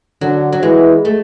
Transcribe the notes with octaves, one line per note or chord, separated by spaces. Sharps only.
D3 F#3
F#3
E3 G#3
A3